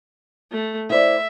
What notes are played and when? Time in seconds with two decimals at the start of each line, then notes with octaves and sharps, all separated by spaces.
0.51 A3
0.90 E4 C5 D5 E5